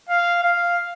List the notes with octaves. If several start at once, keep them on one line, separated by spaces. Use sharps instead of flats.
F5
F5